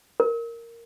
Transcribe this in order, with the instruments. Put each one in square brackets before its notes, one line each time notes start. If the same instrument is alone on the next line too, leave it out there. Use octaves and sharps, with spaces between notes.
[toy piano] A#4